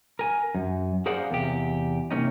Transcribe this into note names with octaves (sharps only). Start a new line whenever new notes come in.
A#4 G#5
F#2
G#4 A#4 C5 D5 F5 F#5
E2 C3 G4
C3 A#3 C#4 D#4